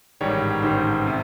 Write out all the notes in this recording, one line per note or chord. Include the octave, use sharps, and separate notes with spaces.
A1 G#2 D#3 G3 C#5
A1 G#2 D#3 G3 C5
C3